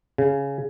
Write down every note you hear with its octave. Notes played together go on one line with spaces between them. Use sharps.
C#3